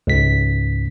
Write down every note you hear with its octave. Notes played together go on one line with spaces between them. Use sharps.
C#2 G#2 B6